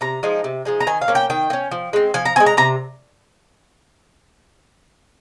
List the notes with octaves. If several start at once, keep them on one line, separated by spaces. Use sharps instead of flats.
C3 A#5
F3 G#3 D#4
C3
F3 G#3 D#4
A#5
D#3 G#5
F5
A#3 C#4
G5
D#3 G5
A#3
C#4
F3
G#3 C4
F3 G#5
A#5
C4 G#5
G#3
A#5
C3 A#5